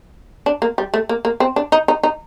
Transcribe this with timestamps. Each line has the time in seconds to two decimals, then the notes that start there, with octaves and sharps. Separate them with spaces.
0.46 D4
0.62 A#3
0.78 G3
0.94 A3
1.09 A#3
1.25 A#3
1.40 C4
1.56 D4
1.72 D#4
1.88 D#4
2.03 D#4